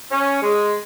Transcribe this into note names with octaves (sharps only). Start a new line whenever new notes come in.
C#4
G#3